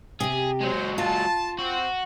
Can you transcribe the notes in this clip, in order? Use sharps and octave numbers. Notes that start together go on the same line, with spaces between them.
C3 G4 G#4
F#3 G#3 C5
F4 A5
C4 F#4